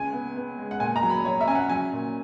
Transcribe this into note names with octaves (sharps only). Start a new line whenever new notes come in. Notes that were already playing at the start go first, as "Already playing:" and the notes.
Already playing: C#2 G#5
B3
B3
G#3
F#5
A#2 G#5
A#5
F#3
B5
F#3 C#5
E5
C#4 G#5
F#5
F#3 G#5
A#2